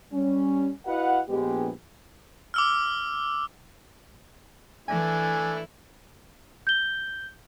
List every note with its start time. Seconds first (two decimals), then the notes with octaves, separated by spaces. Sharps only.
0.13 G3 C#4
0.86 E4 F#4 B4 D#5 F5 F#5
1.29 A#1 G#3 B3 G4
2.54 D6 E6 F6
4.88 E3 A3 D4 E4 G#5
6.67 G6 G7